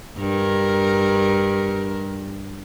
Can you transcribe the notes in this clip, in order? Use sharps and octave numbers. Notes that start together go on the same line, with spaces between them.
G2 A#4